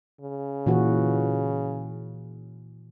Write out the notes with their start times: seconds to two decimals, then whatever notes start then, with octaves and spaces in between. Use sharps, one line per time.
0.20 C#3
0.66 A#2 E3 F#4